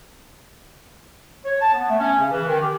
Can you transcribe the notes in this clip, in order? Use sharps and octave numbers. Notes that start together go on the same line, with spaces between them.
C#5
A5
B3
A3
C#4
C#3
E3
D#3
G4